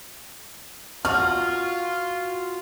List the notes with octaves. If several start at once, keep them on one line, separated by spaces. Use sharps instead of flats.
F4 F#4 F6